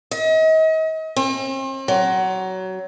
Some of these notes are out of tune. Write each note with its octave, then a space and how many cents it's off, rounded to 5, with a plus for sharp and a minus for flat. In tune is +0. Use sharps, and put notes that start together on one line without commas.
D#5 +40
C4 +40
F#3 +20